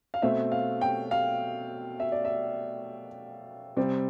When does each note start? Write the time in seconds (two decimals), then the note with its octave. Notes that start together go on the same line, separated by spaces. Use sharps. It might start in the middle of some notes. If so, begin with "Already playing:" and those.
0.14 F5
0.22 B2 A3 C4 E5
0.52 F5
0.81 G5
1.11 F5
2.00 E5
2.12 D5
2.25 E5
3.77 C3 G3 C4